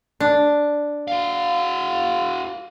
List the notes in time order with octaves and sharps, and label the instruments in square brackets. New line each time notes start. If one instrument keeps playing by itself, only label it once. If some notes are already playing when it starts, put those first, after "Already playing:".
[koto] D4
[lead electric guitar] F#4 F5